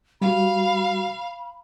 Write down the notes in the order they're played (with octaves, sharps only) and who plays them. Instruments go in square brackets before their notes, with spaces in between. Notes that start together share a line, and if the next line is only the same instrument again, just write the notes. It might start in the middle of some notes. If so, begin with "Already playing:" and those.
[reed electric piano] G3 F#4 [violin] F5 [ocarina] B5